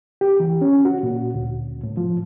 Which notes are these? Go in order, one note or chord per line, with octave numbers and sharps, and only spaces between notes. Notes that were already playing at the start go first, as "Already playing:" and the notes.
G4
E3
C#4
F#4
A#2
D2
A2
F3